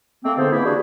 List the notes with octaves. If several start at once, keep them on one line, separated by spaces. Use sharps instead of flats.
A3 A#3 C4
G#2 B2 D3 B3 A4 C5
E3 A#3 E4
G3 D4 F#4 G#4